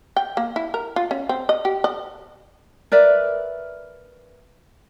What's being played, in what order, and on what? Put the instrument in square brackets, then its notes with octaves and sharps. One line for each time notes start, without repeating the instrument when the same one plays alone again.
[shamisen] G5
A#3
E4
A#4
F4
C#4
C4
D#5
G4
D#5
[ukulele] A#4 B4 D5 E5